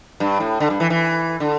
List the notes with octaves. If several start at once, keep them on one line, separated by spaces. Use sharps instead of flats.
G2
A2
D3
G2
E3
E3
D3